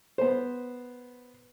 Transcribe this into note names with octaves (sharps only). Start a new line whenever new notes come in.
B3 C5